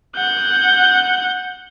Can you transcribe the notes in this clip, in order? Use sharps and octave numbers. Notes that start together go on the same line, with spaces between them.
F#5 G6